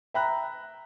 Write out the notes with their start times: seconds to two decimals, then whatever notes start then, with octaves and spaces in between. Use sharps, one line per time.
0.14 E5 G5 A#5 B5 F#6